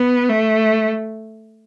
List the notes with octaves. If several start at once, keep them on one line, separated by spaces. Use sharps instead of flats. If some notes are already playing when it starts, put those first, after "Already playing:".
Already playing: B3
A3